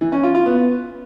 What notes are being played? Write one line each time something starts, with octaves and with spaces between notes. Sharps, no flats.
E3
C#4
F4
F4
B3